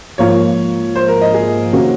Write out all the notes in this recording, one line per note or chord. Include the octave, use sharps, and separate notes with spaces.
G#2 F3 A#3 F4 C#5
C5
A#4
D#5
G#4
C3 D#3 A#3 C#4 F#4